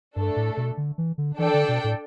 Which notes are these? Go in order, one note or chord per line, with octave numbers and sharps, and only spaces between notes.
G2 A3 D4 A4
A2
B2
D3
E3
D3
E3 D4 A4 D5 G5
D3
B2
A2